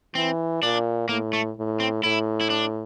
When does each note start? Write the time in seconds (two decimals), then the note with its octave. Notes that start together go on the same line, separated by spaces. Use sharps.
0.15 E3 C4
0.62 A#2 D4
1.09 A2 A#3
1.33 A3
1.57 A2
1.80 C4
2.03 A2 E4
2.41 E4
2.50 D4